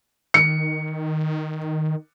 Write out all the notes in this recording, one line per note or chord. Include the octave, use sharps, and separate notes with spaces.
D#3 C#7